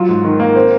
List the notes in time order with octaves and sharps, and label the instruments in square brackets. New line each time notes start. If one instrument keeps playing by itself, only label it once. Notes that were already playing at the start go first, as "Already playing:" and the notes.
Already playing: [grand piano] F#3 F4
G#2
D#3
A#3
C4